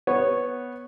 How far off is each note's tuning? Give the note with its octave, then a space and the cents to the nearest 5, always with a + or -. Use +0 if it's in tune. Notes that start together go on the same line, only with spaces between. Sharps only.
B3 +0 C#5 -10